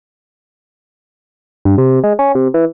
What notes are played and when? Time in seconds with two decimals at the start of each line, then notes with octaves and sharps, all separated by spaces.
1.65 G2
1.78 C3
2.04 G#3
2.19 C#4
2.35 C3
2.54 E3